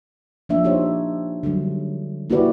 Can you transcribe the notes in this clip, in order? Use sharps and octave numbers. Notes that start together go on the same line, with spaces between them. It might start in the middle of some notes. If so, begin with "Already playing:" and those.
F3 A#3 D4 E5
D#4 G4 C5 C#5
D3 F#3 G3
A#3 E4 F#4 G4 B4 D5